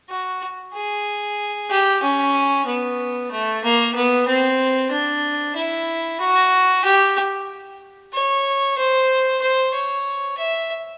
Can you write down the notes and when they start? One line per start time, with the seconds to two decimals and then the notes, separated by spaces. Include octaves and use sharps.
0.10 F#4
0.74 G#4
1.70 G4
2.02 C#4
2.67 B3
3.31 A3
3.64 A#3
3.95 B3
4.27 C4
4.91 D4
5.56 E4
6.20 F#4
6.84 G4
8.13 C#5
8.77 C5
9.41 C5
9.74 C#5
10.37 E5